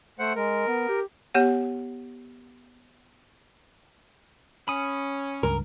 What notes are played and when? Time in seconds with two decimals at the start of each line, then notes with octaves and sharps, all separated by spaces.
0.19 A3 C5 F#5
0.36 G#3 A#4
0.67 B3
0.89 G4
1.35 B3 G4 C#5 F#5
4.68 C#4 B5 D#6
5.43 C#2 G2 A#4